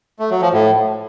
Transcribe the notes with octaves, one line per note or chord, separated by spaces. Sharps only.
A3
F#3
F3
A2